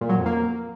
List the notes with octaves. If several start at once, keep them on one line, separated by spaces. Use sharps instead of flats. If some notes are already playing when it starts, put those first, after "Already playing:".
A#2
F#3
F2
A#3